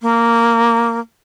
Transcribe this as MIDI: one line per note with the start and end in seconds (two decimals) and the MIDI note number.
0.02 1.00 58